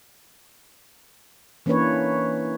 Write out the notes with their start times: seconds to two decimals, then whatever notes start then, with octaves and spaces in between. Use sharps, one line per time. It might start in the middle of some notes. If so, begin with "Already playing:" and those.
1.66 E3 A#3 C#4 D4 B4 C#5